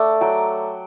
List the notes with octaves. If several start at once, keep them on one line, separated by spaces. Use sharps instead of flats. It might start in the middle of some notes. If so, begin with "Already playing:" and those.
Already playing: A3 D4
F#3 G5